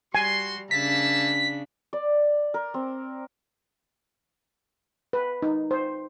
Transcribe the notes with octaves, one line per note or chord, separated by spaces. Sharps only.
G3 F#4 G#5 C6
C#3 A#3 D4 E5 A5 B6
D5
A#4
C4
B4
D#4
C5